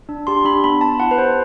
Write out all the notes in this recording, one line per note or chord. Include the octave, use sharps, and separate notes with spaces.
D4
G4 C6
D4 B5
B3 B5
B3 A5
E4 F#5
B4
G4 C5